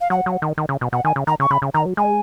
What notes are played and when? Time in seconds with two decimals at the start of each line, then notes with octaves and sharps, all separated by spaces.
0.01 F5
0.10 F#3 F#5
0.26 F#3
0.42 D#3
0.58 D#3
0.69 C#3
0.81 B2
0.93 B2 F#5
1.05 D#3 G#5
1.16 C#3
1.27 D#3 A#5
1.40 C#3 C#6
1.51 C#3 B5
1.62 C#3
1.74 D#3 A#5
1.86 F#3
1.97 G#3 G#5